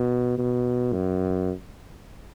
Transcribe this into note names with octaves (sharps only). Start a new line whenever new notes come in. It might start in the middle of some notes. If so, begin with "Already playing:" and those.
Already playing: B2
B2
F#2